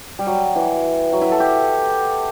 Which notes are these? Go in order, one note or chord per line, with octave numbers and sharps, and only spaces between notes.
G3
F#3
E3
F#3
E4
A4
G4